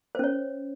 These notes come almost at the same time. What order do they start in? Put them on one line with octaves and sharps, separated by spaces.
C5 C#4 C#5